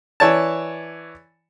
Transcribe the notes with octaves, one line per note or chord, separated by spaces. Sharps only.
E3 C#5 D5 A5